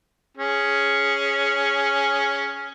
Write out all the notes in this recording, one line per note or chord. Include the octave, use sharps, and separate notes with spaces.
C#4 G#4